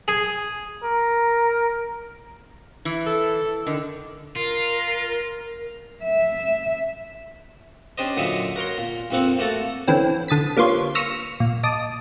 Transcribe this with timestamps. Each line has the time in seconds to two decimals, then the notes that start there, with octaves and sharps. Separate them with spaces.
0.08 G#4
0.83 A#4
2.85 E3
3.07 A4
3.67 D3 D#3
4.36 F4 A#4
6.03 E5
7.98 C#4 D4 G4 C5 D#5
8.17 A#2 D3 F#3 D#5 E5
8.56 F#4 A#4 C#5 C6
8.78 A#2
9.10 A#1 F2 A#3 C4 F#5
9.39 A3 A#3 F#4 A4
9.87 D3 E3 C4 C#4
10.28 D3 D#6 A6 B6
10.57 G3 A#3 B3 F4 C5 C#5
10.95 C#6 E6 F6 A#6 B6 D#7
11.40 A#2
11.63 D#5 A5 D6 D#7